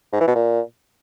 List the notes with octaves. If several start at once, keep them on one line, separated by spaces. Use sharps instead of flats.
G#2
E3
B2
A#2